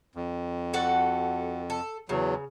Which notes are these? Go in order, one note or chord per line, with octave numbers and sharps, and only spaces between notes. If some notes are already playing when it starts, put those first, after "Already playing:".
F2
F#4 A4 F#5
A4
E2 C#3 F#3